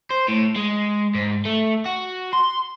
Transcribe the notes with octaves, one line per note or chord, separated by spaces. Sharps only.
C5
A2
G#3
G#2
A3
F#4
C6